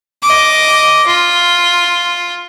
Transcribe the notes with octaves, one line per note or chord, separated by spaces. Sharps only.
D#5 D6
F4